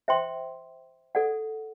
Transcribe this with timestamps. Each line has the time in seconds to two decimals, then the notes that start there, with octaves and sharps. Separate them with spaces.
0.08 C5 E5 G5 C6
1.15 A4 D5 F#5